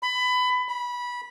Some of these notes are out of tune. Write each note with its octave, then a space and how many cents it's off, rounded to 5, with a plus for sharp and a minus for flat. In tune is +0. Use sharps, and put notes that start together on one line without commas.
B5 +20
B5 -20